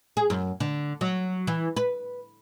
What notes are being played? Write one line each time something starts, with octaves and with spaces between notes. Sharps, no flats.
G#4
F#2
D3
F#3
E3
B4